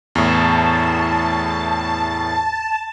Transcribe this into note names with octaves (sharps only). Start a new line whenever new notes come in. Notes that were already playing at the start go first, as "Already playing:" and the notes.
E2 A2 A5